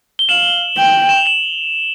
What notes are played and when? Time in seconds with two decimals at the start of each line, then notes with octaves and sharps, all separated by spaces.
0.19 G7
0.29 F5 E7 F#7
0.78 G5
1.09 E7
1.17 F7
1.26 E7 F#7